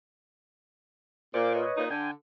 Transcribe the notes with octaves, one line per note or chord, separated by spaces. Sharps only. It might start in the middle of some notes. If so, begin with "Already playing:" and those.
A#2 C5 D6
B4 C#5 D#5
A#2 D#4
D3 G5 G#5